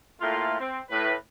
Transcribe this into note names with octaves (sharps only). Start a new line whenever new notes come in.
A2 A3 A#3 F4
C4
A2 B4